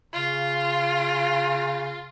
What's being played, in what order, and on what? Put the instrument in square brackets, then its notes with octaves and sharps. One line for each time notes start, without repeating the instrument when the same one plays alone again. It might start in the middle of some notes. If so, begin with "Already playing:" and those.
[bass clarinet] C#3 [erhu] F4